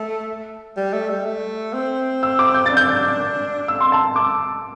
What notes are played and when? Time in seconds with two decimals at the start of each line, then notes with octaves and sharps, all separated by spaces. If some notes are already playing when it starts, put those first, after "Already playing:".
Already playing: A3
0.77 G3
0.93 A3
1.10 G3
1.26 A3
1.73 C4
2.23 E6
2.39 D6
2.54 G6
2.66 D4 A6
2.77 G6
3.68 E6
3.80 C6
3.92 A5
4.16 D6